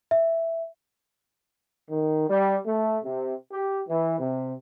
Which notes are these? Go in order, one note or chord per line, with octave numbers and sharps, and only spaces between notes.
E5
D#3
G3
A3
C3
G4
E3
C3